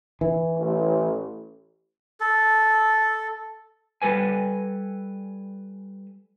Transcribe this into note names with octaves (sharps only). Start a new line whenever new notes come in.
E3
A1
A4
G3 A4 B4 G#5